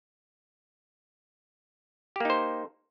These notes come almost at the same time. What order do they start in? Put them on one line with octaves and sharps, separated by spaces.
G4 A#3 D#4 C5